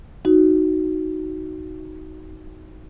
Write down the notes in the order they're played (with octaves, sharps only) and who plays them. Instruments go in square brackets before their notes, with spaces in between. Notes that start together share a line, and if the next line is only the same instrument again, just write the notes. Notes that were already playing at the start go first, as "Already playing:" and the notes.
[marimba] D#4 F#4